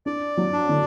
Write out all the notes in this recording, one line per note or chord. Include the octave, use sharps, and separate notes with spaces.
D4 D5
F#3
D4
D3